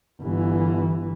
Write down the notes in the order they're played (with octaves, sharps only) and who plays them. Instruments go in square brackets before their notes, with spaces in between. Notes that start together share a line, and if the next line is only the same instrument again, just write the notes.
[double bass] G1 E3